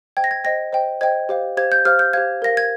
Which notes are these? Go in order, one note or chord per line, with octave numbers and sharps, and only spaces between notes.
C5 D#5 G5 G#6
A#6
G#6
C5 D#5 G5 A#6
C5 D#5 G5
C5 D#5 G5 G#6
G4 C5 F5
G4 C5 F5 G#6
G6
G4 C5 F5 F6
G6
G4 C5 F5 G#6
A#4 F5 A#6
G#6